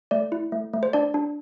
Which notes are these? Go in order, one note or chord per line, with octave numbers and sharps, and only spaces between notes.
A3 D5
E4
A3
A3
C5
D4 D5
D4